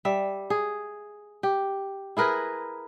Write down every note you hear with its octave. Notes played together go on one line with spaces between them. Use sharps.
G3 E5
G#4
G4
E4 G#4 A#4 B4